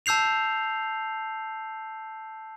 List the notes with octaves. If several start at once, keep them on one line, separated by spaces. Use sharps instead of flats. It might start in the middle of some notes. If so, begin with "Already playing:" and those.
A5 E6 G6 C7 F7